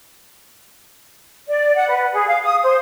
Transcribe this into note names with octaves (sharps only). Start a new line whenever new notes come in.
D5
F#5
B4
G#4
F5
D#6
C5